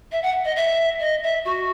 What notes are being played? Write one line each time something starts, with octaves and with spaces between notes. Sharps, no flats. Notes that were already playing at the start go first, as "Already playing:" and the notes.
E5
F#5
D#5
E5
D#5
E5
F#4